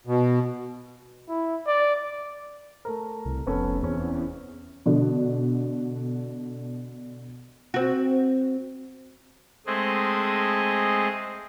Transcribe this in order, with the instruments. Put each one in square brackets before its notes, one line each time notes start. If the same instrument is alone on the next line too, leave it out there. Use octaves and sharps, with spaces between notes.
[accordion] B2
[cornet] E4
D5
[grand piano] A3 A#4
[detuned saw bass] C2
[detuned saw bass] F1 [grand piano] B3 C#4 A4
[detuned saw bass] E2 [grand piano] C4 C#4
[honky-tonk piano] B2 D3
[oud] C4 F#4
[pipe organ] G#3 A3 C4 G#4 D#5